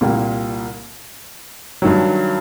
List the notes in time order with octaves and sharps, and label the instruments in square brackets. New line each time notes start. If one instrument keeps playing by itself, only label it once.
[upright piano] C2 A#2 G3 A#3
G2 D#3 F#3